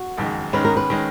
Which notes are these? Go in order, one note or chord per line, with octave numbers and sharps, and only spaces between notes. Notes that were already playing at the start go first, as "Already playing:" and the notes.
Already playing: F#4
F#1 F2 D#3 G#3
G#2 D#3 G#3 C#4 B4
A#4
B4
D#3 G#3 C#4